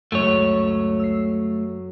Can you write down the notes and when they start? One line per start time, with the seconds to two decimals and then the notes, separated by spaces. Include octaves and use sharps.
0.12 C#2 F#2 A3 C#5
0.99 E6 C7